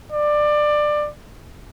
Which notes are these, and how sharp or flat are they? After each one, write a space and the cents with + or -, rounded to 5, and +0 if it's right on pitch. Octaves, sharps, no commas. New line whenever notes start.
D5 +20